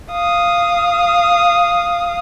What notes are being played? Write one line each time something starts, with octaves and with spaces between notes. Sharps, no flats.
F5 D#6